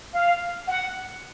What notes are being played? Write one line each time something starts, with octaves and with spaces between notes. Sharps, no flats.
F5
F#5